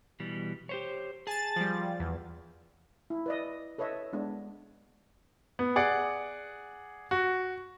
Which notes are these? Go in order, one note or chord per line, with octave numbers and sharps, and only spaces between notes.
B2 E3 G3
G4 C5 C#5
G#4 G#5 A5 A6
F3 G3
E2
E4
B4 D5 D#5
A4 B4 C#5 D#5 E5
G#3 B3 D4
B3
G#4 D5 F#5
F#4